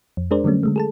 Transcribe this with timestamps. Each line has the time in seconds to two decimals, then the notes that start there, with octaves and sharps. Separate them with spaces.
0.17 F2
0.31 G#3 D4 G#4 A#4 C5 D5
0.44 D3 F#3 G3 A3 C#4
0.63 D3 G#3 A3
0.76 G#4 A4 A5